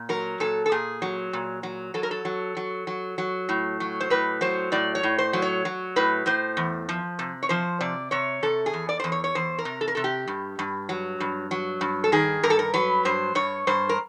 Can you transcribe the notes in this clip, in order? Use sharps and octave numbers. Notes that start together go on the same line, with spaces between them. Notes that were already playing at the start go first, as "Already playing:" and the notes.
Already playing: A#2
F#3 A#4
A#2 A4
A4
A#2 G#4
F#3
A#2
F#3
F#3 A4
A#4
A4
F#3
F#3
F#3
F#3
A2
F#3
C5
A2 B4
F#3 C5
A2 D5
C#5
A2
C5
F#3
C#5
F#3
A2 B4
A2 C5
E2
F3
C3
C#5
F3 C5
C3 D5
C3 C#5
C3 A4
G#4
E2
D5
E2 C5
C#5
C#5
E2 C5
A#4
C3
A4
A#4
C3 A4
G4
G2
G2
F#3
G2
F#3
G2
A4
D#3 G#4
G2 A#4
A4
A#4
F#3 B4
G2 C5
G2 C#5
G2 C5
A#4